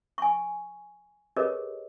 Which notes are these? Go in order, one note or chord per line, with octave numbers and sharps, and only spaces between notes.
G#5 C#6
G4 G#4 A#4 B4 C#5 D#5